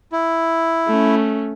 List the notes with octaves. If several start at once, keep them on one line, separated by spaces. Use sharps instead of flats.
E4
A3 C#4